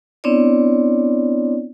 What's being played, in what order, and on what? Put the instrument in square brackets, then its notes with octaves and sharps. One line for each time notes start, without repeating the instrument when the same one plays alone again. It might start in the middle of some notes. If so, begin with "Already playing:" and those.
[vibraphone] B3 C4 D4 E4 C#5 D5